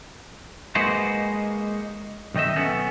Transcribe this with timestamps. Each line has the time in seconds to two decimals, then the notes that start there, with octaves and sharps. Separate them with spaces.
0.75 G#3 A#3 D#4 F#4 B4 C5
2.34 B1 D#3 D#4 D#5 E5
2.56 B3 C#4 A4